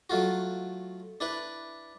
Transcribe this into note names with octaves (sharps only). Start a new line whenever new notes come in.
F#3 A3 F4 F#4
D4 E4 B4